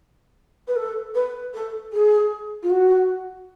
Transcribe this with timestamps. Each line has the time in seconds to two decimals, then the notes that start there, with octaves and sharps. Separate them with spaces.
0.68 B4
0.76 A4
1.15 B4
1.54 A4
1.93 G#4
2.63 F4
2.70 F#4